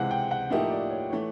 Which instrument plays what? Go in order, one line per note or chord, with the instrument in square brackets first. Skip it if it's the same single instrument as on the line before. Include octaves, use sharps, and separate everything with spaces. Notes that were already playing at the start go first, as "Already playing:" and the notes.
Already playing: [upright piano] C#2 C3 E3 G#3 [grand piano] F#5
[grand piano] G5
F#5
[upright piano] A2 F3 A#3 D#4 G4 [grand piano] E5
[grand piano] D5
C#5
[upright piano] E3 A3 [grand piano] C#5